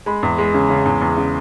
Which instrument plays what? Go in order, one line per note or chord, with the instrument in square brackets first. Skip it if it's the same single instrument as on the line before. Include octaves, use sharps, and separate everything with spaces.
[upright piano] G#3 B5
E2
G#3
C#3
C#3
E2
E2
C#3